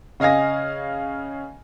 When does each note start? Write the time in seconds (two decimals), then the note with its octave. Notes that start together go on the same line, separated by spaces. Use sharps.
0.20 C#3 D#5 F5 G#5 A#6